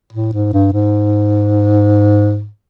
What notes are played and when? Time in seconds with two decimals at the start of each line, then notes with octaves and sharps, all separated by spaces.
0.13 A2
0.33 G#2
0.53 G2
0.73 G#2